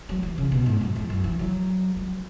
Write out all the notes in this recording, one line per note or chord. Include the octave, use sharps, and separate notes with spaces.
F#3
E3
C#3
B2
G#2
F#2
E2
F#2
E3
F#3
F#3